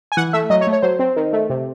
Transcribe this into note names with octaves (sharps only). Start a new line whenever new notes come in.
G#5
E3 F#5
A3 E5
F#3 D#5
C#5
A3
C#5
F#3 C5
C4
D#3
A3
C3